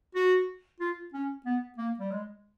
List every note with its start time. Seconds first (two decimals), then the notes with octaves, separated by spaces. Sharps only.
0.15 F#4
0.80 F4
1.14 C#4
1.46 B3
1.78 A#3
2.00 G3
2.12 G#3